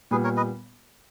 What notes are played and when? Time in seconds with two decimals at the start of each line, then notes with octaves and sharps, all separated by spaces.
0.11 A#2 G3 B3 G#4 B4
0.24 A#4 C#5
0.37 B4 D#5